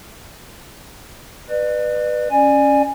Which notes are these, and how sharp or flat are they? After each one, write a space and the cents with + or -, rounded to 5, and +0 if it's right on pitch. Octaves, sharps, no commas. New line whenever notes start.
B4 +0 D5 +40
C#4 +0 D5 +25 G#5 +0